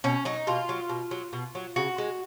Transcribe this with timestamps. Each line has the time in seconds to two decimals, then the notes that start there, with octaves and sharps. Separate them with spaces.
0.04 B2 C#4
0.25 F#3 D#4
0.47 B2 F4
0.69 F#3
0.89 B2
1.11 F#3
1.33 B2
1.55 F#3
1.76 C#3 F#4
1.98 G#3